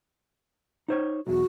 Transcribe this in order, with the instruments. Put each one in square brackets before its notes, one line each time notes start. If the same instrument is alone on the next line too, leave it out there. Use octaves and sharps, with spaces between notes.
[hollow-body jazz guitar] D#4 C5 C#5
[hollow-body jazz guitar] B1 E2 [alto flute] F#4